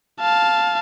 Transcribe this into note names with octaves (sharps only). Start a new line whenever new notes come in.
F5 A5